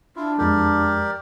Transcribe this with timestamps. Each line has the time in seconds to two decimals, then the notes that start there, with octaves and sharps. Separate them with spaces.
0.16 D4 E4 F4
0.38 F2 G#3 G4 A#4 D5